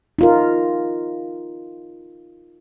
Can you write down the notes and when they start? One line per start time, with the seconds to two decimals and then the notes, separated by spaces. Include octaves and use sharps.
0.19 D#4 F4 A#4